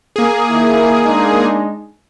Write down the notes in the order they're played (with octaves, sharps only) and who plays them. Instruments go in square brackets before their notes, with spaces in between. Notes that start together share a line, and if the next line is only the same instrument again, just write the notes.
[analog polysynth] A#3 G#4
[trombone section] D#3 E4
G#3 D4 D#4